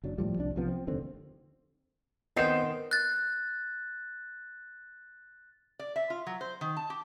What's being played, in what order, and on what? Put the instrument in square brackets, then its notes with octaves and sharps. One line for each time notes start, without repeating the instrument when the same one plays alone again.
[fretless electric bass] F#1 F#3 D4
A2 F3 G3
C2 D4
B1 C3 F3 B3
C4
F1 D#2 D3 C4
[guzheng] D#3 C5 G5 [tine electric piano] B3 C4 [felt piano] D#5 C7 E7
[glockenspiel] F#6 A6
[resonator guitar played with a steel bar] D5
E5
F4
F#3
C5
D#3
A5
G4